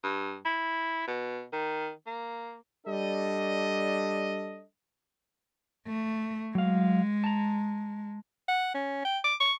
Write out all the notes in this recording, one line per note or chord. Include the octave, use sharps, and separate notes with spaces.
G2
E4
B2
D#3
A#3
G3 D4 A4 D#5
A3
F#3 G#3 F5
A5 A#5
F#5
C#4
G5
D6
C#6